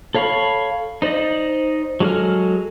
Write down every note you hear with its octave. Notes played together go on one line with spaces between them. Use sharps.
A4 C#5 F5 B5 C#6
D#4 C5 D5 D#5
F#3 G#3 G#4 A4 F6